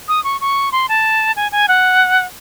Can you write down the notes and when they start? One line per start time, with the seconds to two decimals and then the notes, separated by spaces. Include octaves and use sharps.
0.08 D#6
0.24 C#6
0.41 C#6
0.72 C6
0.89 A5
1.36 G#5
1.52 G#5
1.68 F#5